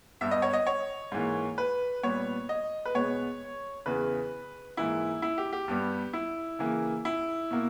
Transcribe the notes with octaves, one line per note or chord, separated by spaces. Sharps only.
G2 G3 B3 E5
D#5
C#5
D#5
C#5
G#2 E3 A#3
B4
A#2 G3 B3 C#5
D#5
B4
B2 G#3 B3 C#5
E2 C#3 E3 B4
G#2 E3 A#3 E4
E4
G4
G4
G2 G3 B3
E4
C#3 E3 A#3
E4
B2 A#3